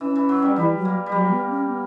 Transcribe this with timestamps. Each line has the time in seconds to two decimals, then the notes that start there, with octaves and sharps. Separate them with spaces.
0.01 E3 C#4
0.15 E3
0.29 F#3
0.42 G3
0.56 E3 G3
0.76 F#3
0.85 A#3
1.06 G3
1.12 F#3 A#3
1.31 B3
1.49 C#4
1.68 B3